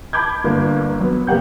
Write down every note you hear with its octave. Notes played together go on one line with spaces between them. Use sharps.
A5 B5 D6 G6 G#6
G1 D3 A#3
F#3 B3
F1 A#3 G4 F#5 G6